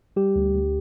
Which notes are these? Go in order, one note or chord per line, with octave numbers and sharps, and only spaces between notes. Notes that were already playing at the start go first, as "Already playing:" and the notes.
G3 G4
D2
D2